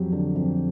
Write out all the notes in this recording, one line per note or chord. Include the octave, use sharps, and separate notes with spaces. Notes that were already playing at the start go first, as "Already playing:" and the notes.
Already playing: F2 F#3 G4
D3
F2